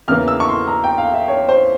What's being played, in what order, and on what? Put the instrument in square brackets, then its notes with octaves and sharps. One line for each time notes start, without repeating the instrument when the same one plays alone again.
[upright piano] E2 C#3 E3 A#3 F6
E6
C#6
C6
A#5
G5
F5
E5
C#5
C5